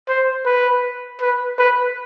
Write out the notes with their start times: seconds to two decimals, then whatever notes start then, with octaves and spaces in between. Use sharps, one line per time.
0.08 C5
0.45 B4
1.21 B4
1.59 B4